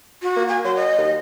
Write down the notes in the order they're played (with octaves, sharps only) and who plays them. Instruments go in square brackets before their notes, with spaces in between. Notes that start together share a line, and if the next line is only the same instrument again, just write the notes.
[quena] F#4
[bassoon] A#3
[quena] G#5
[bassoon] F#3 [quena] C6
[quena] D#5
[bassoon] D#2